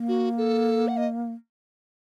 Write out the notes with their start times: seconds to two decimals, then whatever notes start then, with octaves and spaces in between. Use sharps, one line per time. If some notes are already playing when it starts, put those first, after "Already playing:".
Already playing: A#3
0.08 F#4
0.38 A4
0.88 F#5
0.97 D#5